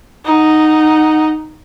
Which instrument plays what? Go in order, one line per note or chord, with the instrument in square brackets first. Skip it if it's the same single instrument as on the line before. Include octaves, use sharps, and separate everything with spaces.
[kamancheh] D#4 F#5